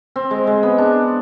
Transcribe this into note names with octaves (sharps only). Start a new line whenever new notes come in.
C4
G#3
G#3
B3
D4